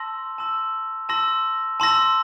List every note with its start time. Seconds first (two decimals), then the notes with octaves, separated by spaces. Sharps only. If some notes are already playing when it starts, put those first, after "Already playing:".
Already playing: A5 C6 E6 A#6
0.38 A5 C6 E6 A#6
1.09 A5 C6 E6 A#6
1.80 A5 C6 E6 A#6